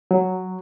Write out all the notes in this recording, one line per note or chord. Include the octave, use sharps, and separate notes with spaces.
F#3